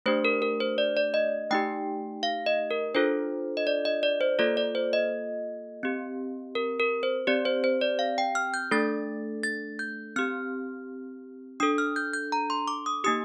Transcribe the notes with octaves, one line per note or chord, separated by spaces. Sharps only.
A3 D4 G4 C5
A#4
A#4
C5
D5
D5
D#5
A3 D#4 G4 G5
F5
D#5
A#4
D4 F4 A4 C5
D#5
D5
D#5
D5
C5
A#3 F4 A4 D5
D5
C5
D#5
C4 G4
A#4
A#4
C5
C4 G4 D5
C5
C5
D5
F5
G5
F6
G6
A3 D4 A4 A6
A6
G6
C4 G4 F6
D4 A4 D#6
F6
G6
G6
A#5
C6
D6
D#6
A#3 D#4 G4 D#6